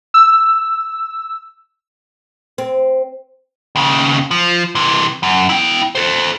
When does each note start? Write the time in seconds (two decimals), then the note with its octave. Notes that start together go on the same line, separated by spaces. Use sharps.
0.14 E6
2.58 C4
3.76 D#2 C#3
4.31 F3
4.75 C3 E3
5.23 F#2
5.49 E4 G5
5.95 A4 C5